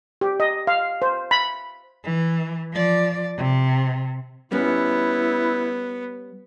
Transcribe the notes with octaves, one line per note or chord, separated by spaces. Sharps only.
G4
D#5
F5
C5
B5
E3
F3 D5
C3
G3 B3 C#4 E4